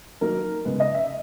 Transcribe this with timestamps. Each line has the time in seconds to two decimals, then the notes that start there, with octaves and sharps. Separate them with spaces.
0.21 D#3 F#3 A#3 A#4
0.65 C#3 G#3 B3 B4
0.80 D#5
0.94 E5